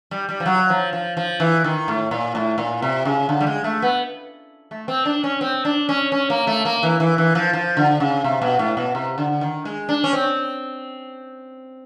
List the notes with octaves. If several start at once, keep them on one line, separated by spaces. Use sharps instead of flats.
G3
G3
F3
F#3
F3
F3
F3
E3
D#3
A2
A#2
A2
A#2
C3
C#3
D3
G3
G#3
A3
B3
A3
C4
D4
C#4
C4
D4
C#4
C#4
A#3
A3
A#3
E3
E3
E3
F3
F3
D3
C#3
C3
B2
A2
B2
C3
D3
D#3
G#3
D4
C#4
C4